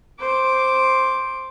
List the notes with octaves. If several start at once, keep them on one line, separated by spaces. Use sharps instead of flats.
C5 D6